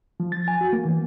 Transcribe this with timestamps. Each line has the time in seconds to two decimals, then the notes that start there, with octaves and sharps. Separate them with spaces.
0.20 F3
0.32 A6
0.48 G#5
0.61 F#4
0.73 A#3
0.85 E3